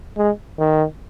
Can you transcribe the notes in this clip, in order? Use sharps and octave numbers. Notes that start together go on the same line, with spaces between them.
G#3
D#3